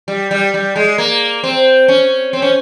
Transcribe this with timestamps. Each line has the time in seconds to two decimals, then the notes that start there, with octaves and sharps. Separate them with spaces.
0.08 G3
0.31 G3
0.54 G3
0.76 G#3
0.98 A#3
1.43 C4
1.88 C#4
2.33 C4
2.42 C#4